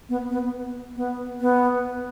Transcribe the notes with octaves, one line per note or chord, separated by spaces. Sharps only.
B3
B3
B3
B3